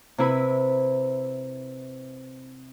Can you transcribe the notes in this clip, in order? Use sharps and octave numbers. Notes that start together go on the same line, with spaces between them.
C3 E4 B4 B5